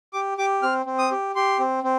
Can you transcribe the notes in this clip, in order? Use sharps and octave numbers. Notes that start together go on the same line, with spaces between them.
G4 D6
G4 D6
C4 F6
C4
D#6
G4
G4 C6
C4
C4